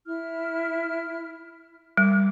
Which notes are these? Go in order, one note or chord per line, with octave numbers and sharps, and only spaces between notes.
E4 F6
G3 D6